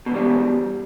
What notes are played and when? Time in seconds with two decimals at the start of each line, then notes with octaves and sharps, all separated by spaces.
0.06 B2
0.10 E2
0.15 G3